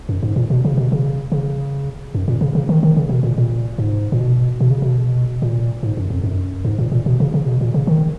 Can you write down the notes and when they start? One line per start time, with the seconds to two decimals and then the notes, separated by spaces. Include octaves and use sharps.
0.09 F#2
0.23 G#2
0.36 A#2
0.50 B2
0.65 C#3
0.77 B2
0.92 C#3
1.32 C#3
2.15 F#2
2.28 A#2
2.41 C#3
2.55 C#3
2.69 D#3
2.83 D#3
2.96 C#3
3.10 B2
3.23 A#2
3.38 A#2
3.78 G#2
4.12 A#2
4.20 B2
4.60 B2
4.71 C#3
4.82 B2
5.42 A#2
5.83 G#2
5.97 F#2
6.10 F2
6.23 F#2
6.65 G#2
6.78 A#2
6.92 A#2
7.06 B2
7.20 C#3
7.34 C#3
7.46 B2
7.61 A#2
7.74 C#3
7.87 D#3